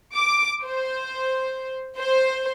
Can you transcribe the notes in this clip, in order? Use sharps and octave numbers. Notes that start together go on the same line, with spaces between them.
D6
C5
C5